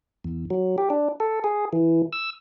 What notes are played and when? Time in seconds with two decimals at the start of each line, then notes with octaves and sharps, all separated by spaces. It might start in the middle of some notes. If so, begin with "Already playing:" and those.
0.24 E2
0.50 F#3
0.78 G4
0.90 D4
1.20 A4
1.44 G#4
1.73 E3
2.13 E6